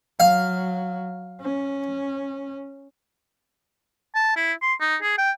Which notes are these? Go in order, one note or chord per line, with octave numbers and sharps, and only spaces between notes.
F#3 F5
C#4
A5
E4
C6
D#4
G#4
G5